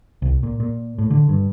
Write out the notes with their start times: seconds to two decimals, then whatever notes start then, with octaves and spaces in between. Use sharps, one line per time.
0.22 C2
0.43 A#2
0.60 A#2
0.98 A2
1.11 D3
1.29 G2